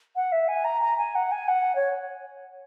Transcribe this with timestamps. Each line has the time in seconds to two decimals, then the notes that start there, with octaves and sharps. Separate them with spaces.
0.16 F#5
0.32 E5
0.48 G#5
0.65 A#5
0.82 A#5
0.98 G#5
1.15 F#5
1.32 G#5
1.48 F#5
1.76 C#5